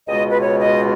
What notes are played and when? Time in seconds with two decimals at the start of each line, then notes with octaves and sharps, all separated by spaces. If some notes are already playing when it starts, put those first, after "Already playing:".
0.07 C#2 B2 G#3 D#5
0.29 B4
0.41 C#5
0.58 D#5